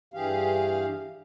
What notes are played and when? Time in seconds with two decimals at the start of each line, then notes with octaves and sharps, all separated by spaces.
0.14 G2 E3 G4 G#4 F5